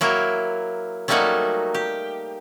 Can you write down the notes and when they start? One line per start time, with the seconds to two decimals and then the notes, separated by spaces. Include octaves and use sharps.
0.01 F#3 A#3 E4
1.08 F#3 G3 A3 A#3 D#4 F#4
1.74 G4